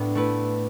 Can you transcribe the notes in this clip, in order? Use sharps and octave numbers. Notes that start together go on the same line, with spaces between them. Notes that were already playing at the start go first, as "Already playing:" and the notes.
Already playing: A2 B3 D4 D5 E5
A3 E4 B4